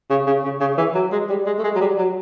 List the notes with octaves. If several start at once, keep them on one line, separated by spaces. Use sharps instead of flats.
C#3
C#3
C#3
C#3
E3
F#3
G#3
G3
G#3
A3
G#3
F#3
G3
F#3